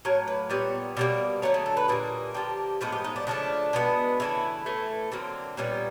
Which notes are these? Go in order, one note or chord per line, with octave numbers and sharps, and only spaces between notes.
A2 F#3 A#3 C#5
B4
A#2 G3 B3 C#5
B2 G3 A#3 D5
D3 F#3 A3 C#5
G#4
A4
B4
A#2 G3 A#3 G#4
D3 F3 A#3 G4
A2 F3 G#3 B3 F#4
G4
D#4
D4
C#3 F3 A3 D4
B2 G#3 B3
C#3 E3 A3 E4
A2 E3 A3
D3 F#3 A#3 C4
A#2 G3 B3 C#4